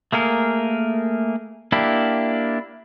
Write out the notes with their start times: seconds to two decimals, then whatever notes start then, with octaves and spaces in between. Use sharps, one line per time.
0.12 A3 A#3 G#4 A#4
1.72 A#3 D4 E4 G4